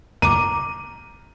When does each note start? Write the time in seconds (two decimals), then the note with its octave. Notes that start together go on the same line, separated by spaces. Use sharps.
0.22 A#5 D6 D#7